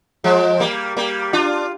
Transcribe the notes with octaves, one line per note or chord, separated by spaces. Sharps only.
F3 G#3
G3 A#3
G3 A#3
D4 F4